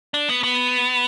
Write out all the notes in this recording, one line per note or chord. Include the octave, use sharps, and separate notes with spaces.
D4
B3
B3